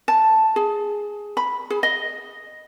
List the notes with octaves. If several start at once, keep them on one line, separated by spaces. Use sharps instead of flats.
A5
G#4
B5
G#4
D#5